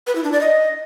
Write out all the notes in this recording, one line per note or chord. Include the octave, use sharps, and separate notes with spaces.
B4
E4
D4
D5
D#5